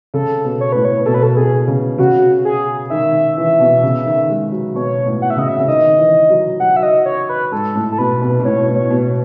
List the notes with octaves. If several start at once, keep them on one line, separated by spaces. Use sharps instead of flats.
C#3 A4
B2
C#5
A2 B4
C#5
B2 A4
B4
A4
B2 G#4
C#3
C#3 F#4
G#4
D#3 E5
E3
B2
C#3
D#3
G#3
F#3
B2 C#5
A2
F#5
E5
C#3 D#5
E5
C#3
D#3 D#5
E3
F#3
F#3 F#5
E5
D#5
C#5
B4
G#2 A4
A2
A4
B2 B4
B2
B2
A2 C#5
A2
C#5
B2